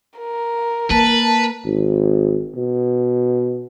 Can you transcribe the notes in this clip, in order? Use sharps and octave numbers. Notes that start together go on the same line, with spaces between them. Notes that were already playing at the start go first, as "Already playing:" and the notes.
A#4
A#3 B4 A5
G#1
B2